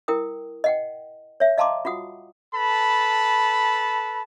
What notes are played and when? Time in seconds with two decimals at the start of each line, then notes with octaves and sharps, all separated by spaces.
0.08 E4 A#4 G5 D#6
0.64 D#5 F#5 G5
1.40 C#5 E5
1.58 D#5 F5 A5 A#5 C6 D6
1.85 F4 F#4 F#5 D#6
2.55 A4 B4 A5 B5